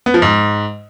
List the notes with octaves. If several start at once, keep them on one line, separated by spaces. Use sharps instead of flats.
B3
F3
G#2